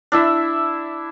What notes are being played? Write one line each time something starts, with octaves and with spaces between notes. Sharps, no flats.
D4 E4 E5